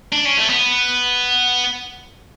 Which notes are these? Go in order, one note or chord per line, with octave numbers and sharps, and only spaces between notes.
D4
C#4
A3
B3